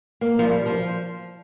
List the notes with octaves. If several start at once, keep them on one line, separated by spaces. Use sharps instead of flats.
A#3
F3
G3
F3